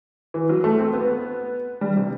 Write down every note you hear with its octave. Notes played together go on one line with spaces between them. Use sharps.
E3
F#3
A3
C4
B3
G3
C3